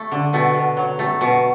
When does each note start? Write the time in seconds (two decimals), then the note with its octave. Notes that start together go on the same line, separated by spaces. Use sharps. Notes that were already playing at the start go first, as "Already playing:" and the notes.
Already playing: A3
0.12 D3
0.33 B2 A3
0.55 B2
0.77 F#3
0.99 A3
1.21 B2